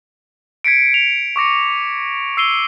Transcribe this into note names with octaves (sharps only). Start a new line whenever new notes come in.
G#6 B6 C#7 D7
F7
C#6 D6 A#6 C#7
E6 C7 D#7 G7